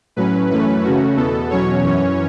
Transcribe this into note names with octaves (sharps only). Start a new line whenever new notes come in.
A2 F#3 C#4 B4
F#2 E3 A3 C#4 B4
C#3 A3 C#4 F#4
E2 B2 B3 A4
E2 B2 F#3 C#4 C#5
F#2 E3 C#4